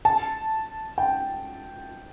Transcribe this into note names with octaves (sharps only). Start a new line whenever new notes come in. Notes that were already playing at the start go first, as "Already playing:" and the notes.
A5
G5